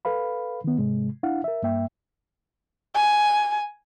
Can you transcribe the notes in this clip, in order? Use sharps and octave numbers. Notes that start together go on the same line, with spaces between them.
A4 B4 F5 B5
D#3 B3
G#2 C3 G#3
D4 E4 F5 F#5
A#4 E5
G2 A#3 E5 G5
G#5